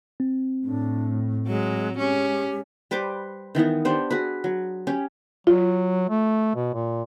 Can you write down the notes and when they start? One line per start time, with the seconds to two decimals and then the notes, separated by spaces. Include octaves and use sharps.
0.20 C4
0.64 A2 D4
1.47 F#3 G#3
1.98 G#3 C#4 G4
2.91 G3 B4 C5 D6
3.55 D#3 E3 B3 D#4
3.85 B3 D4 G4 C5
4.10 F#4 G#4 B4
4.44 F#3
4.87 C#4 G4
5.47 F#3 F4
6.09 A3
6.55 B2
6.74 A#2